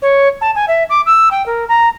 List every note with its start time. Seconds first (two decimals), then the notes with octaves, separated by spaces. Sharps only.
0.02 C#5
0.41 A5
0.55 G#5
0.68 E5
0.90 D6
1.06 E6
1.31 G5
1.46 A#4
1.68 A#5